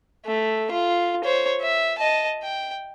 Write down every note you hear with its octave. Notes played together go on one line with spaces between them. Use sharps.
A3
F4
C5 C#5
E5
D#5 A5
G5